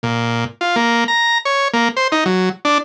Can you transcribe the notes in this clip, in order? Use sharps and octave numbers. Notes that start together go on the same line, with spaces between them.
A#2
F4
A#3
A#5
C#5
A#3
C5
D#4
F#3
D4